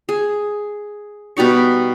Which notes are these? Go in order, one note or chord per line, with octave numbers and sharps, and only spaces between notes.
G#4
B2 G3 D#4 C#6